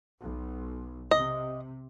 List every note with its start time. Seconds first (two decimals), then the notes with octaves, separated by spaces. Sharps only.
0.21 B1
1.11 C3 D#5